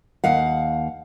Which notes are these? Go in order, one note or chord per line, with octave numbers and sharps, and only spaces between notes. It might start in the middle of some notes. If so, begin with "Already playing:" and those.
D#2 F5 F#5